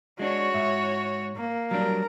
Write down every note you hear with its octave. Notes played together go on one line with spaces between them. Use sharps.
G#3 D4 F#4 C#5
G#2 E5
A#3
F#3 G3 D4 A#4